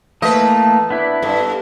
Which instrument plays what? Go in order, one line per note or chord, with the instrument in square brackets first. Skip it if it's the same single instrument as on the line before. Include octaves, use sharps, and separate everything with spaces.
[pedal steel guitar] E3 A3 A#3 [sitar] B4 D#5 [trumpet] A5
[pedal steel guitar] B3 E4 [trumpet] D4
[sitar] G2 [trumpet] A4